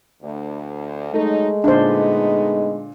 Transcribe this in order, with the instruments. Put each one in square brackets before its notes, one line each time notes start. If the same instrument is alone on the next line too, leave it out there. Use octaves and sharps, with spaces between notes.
[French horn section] D2
[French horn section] F#3 D#4 [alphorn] G#3 [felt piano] A3
[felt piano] A#2 D3 [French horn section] A3 B3 D#4 [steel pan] D4 C5